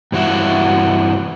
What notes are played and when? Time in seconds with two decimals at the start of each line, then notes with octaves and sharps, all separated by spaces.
0.12 G2 E3 F#4 E5